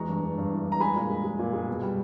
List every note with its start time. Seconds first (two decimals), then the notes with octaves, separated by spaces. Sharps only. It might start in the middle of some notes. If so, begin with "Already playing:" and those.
Already playing: E2 G#3 A#5 C#6
0.09 G2
0.23 G2
0.38 G2
0.52 E3
0.66 G2
0.72 A#5
0.80 G#3 G#5 B5
0.96 A#2
1.10 G#3
1.24 G#3
1.39 A#2
1.53 G#3
1.68 B2
1.82 G3